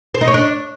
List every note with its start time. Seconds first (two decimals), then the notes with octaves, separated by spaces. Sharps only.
0.14 C5
0.21 D#4
0.28 C#5
0.34 D4